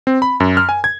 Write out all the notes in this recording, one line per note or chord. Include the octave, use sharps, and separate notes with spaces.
C4
B5
F#2
F6
G#5
G#6